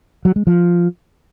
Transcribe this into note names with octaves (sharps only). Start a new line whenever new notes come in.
F#3
G#3
F3